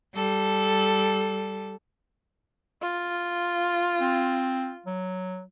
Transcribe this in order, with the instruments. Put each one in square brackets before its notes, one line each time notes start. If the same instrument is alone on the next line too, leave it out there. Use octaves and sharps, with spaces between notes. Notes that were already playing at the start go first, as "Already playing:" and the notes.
[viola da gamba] G3 A4
[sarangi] F4
[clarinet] C4
F#3